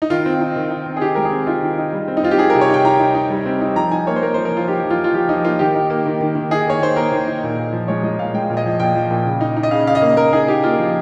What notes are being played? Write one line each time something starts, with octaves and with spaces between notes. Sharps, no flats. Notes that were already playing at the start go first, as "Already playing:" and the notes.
D#4
D#3 F4
C4
D#4
D#3
D#4
C4
G#4
D#3 G4
G#3 A#4
G#4
C4
D#4 F4
D#3
D#4
G3
C4
D#4
C4 F4
G4
D#4 G#4
C3 A#4
C#5
D#4 G5
D#4 A#5
D#4
D#4
G3
C4
D#4
F3 A#5
D#4 G#5
A#3 C#5
C5
A#3 A#4
F3 C5
A#4
F3 F4
D#4 G4
F3
F4
F3
F4
F3 G4
F3 D#4
A#3 F4
D#3 G4
D#4
A#3
D#3
D#3
D#3
D#4 G#4
A#3 C#5
D#3 C5
A#3 A#4
D#3
D#4
A#2
A#2
F3
G#3 C#5
G#3 D#5
A#2 F5
G#3 G5
A#2
D#5
F3
A#2 G5
F3
A#2
C#3
D#4
D#4
D#5
C#3 F5
C#3 F5
D#5
A#3
A#3 A#4
D#4 G#4
D#4 G4
A#3 F4
F3